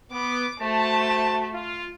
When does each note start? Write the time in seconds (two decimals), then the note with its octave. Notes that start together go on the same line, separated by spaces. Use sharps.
0.12 B3 D6
0.60 A3 F#4 C5 A5
1.54 F4